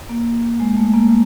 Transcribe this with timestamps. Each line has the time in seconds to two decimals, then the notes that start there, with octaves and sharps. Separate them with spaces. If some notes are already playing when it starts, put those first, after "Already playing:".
0.09 A#3
0.60 G#3
0.77 A3
0.93 A#3